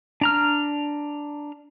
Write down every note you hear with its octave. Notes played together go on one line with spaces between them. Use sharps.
D4 A#5 F6